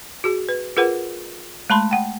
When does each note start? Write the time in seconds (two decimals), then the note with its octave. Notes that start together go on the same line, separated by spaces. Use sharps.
0.24 F#4 G#4
0.49 B4
0.77 F4 G#4 A#4 B4 F#5
1.70 G#3 A3 A5 B5 C6
1.91 F#5 G5